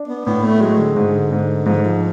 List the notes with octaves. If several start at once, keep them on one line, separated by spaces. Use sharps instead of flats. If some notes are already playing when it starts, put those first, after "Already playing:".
Already playing: D4
B3
A2 B3
A3
F#3 G#3
D3
G#2 D3
G#2
G#2 F3
D3
F3